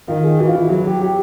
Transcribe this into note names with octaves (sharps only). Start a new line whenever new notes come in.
D#3 F4
G#4
E3 F#4
F4
E4
F#3 F#4
G4
G4